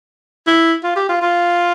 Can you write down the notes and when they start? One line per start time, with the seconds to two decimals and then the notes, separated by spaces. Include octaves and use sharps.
0.47 E4
0.84 F4
0.96 G4
1.09 F4
1.22 F4